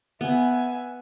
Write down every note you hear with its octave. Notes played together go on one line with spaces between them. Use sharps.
B3 E5 G#5